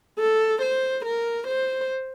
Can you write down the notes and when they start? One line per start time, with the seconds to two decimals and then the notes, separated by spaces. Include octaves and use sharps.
0.19 A4
0.62 C5
1.05 A#4
1.47 C5